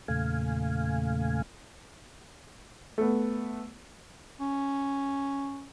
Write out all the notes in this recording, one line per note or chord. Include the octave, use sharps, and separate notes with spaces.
E2 A#2 C#3 A3 F5 G#5
A3 B3
C#4